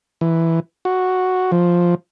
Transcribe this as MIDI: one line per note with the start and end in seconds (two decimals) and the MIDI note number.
0.21 0.60 52
0.85 1.51 66
1.52 1.95 53